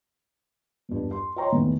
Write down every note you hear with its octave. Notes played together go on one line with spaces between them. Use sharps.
E2 G2
C6
C#5 D#5 G5 A#5 C6 C#6
E2 D#3 A3 B3